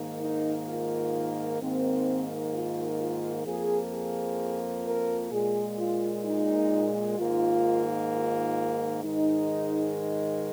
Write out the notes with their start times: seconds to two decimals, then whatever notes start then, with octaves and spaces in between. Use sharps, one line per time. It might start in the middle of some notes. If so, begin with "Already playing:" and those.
Already playing: G#2 D#3 A#3
0.21 D#4
0.68 F4
1.61 G#2 D#3 A#3 C4
2.53 F4
3.00 F4
3.46 F2 F3 A#3 G#4
3.93 G#4
4.86 A#4
5.32 A#2 G#3 G#4
5.78 F4
6.25 D#4
7.18 G#2 D#3 A#3 F4
8.11 F4
9.04 G#2 D#3 G#3 D#4